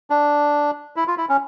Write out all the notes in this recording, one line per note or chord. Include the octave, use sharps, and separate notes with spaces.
D4
E4
F4
E4
C#4